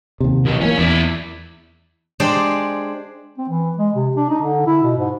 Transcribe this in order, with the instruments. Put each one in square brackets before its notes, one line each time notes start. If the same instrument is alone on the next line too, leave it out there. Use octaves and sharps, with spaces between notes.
[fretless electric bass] D#2 C3
[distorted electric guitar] B1 F#3 [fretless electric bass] D#3
[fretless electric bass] E3 F3 A#3 [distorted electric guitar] C#4
[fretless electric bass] E2 [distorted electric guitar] E4 D5
[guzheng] G#3 D4 G4 G#4 C5 D5
[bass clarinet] C4
E3
G#3
C3
D4
D#4
D3
E4
B2
G#2